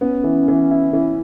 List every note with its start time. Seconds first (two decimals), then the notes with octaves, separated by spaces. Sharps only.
0.01 B3 C#4
0.24 E3
0.48 E3
0.71 E4
0.93 E3 C#4